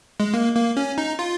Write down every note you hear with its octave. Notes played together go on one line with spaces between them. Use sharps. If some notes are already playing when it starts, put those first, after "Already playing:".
G#3
A#3
A#3
C#4
D#4
F4